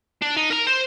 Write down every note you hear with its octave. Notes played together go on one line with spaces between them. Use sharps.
D4
D#4
A#4 A#5
C5